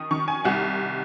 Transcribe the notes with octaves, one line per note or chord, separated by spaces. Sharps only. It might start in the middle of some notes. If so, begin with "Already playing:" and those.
Already playing: D#3 D#6
D#3 C#6
G#5
C2 F#5